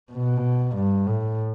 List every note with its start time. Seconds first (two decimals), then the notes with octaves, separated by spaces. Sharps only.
0.12 B2
0.76 G2
1.07 A2